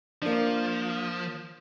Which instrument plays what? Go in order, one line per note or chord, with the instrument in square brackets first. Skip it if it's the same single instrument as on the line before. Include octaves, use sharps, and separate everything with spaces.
[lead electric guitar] F3 [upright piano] A#3 D4